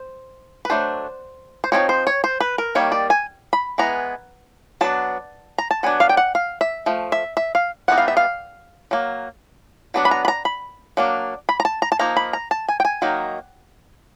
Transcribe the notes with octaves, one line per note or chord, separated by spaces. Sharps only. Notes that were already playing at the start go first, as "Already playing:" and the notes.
Already playing: C5
B4
F#3 A3 D4 C5
C5
F3 A3 C4 D#4 C#5
C5
C#5
C5
B4
A#4
D#3 G3 A#3 C#5
D5
G#5
B5
E3 G#3 B3 A#5
F#3 B3 D4 A5
A#5
A5
F#3 B3 D4 G#5
F5
G5
F#5
F5
E5
F3 A3
E5
E5
F5
E3 G3 B3 D#4 F#5
F5
E5
F5
F#3 A#3
F#3 B3 D4
B5
A#5
B5
A#5
B5
F#3 A#3 D4
B5
A#5
A5
A#5
A5
F3 A#3 D#4 A#5
B5
A#5
A5
G#5
G5
G#5
D#3 F#3 A#3 D#4